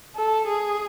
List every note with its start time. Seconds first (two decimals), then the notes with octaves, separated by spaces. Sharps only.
0.15 A4
0.47 G#4